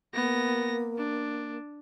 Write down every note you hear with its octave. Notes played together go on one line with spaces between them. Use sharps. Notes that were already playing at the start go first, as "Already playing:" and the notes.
A#3 B3 A#6
D4